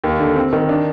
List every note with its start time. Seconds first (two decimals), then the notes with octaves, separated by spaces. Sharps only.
0.04 D#2
0.20 D3
0.36 C4
0.53 D#3
0.69 D4